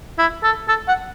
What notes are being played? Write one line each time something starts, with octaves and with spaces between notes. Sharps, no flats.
E4
A4
A4
F#5